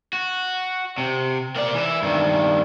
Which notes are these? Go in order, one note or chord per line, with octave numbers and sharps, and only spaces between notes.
F#4
C3
A#3 D5
E3 E4
G2 D#3